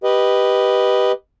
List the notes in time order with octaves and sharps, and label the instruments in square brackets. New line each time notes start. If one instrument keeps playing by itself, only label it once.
[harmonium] G4 B4 D#5